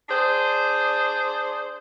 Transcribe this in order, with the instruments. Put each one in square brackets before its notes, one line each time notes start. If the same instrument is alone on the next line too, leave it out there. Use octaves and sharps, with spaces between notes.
[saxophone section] D4 G#4 C5 D5